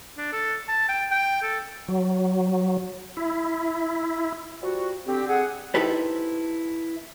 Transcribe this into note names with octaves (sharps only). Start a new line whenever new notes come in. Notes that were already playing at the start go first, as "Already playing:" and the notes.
D4
A4
A5
G5
G5
A4
F#3
E4
F3 G3 F#4
D3 C4 G4
G#4 F#5
D#4 E4 G4 A4 B4 C5